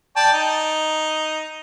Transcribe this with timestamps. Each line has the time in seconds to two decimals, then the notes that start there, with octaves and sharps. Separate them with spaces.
0.16 D5 G5 A5
0.33 D#4